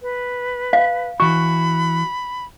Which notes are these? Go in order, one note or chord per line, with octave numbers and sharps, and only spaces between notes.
B4
F5
E3 F#4 B5 C#6